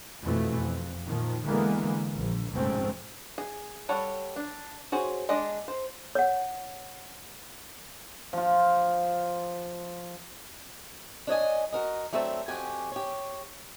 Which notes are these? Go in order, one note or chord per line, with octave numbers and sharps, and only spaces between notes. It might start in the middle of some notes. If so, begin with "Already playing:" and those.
F2 B2 E3 A3
F2
A#2 D#3 F3
D3 E3 G#3 A#3 B3
A#1
F1 G#2 B2 A3 C4 C#4
G#4
G3 A4 C#5 F#5
D4
F#4 G#4 C5 C#5
G#3 D4 D5 D#5
C5
C#5 F#5
F3 F4
D4 C#5 D#5 G#5
F#4 A#4 D#5
F#3 A3 C4 D4 E5
F2 F#4 G4 G#5
G4 C#5